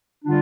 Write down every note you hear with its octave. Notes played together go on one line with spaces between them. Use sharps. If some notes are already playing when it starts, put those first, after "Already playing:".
D3 G3 D4 F4